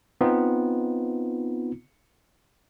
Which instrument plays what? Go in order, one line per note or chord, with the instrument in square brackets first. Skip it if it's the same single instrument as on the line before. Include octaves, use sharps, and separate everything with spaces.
[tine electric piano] B3 C4 D#4 F4